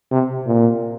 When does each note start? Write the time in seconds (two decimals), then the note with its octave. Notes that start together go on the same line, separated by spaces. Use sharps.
0.11 C3
0.47 A#2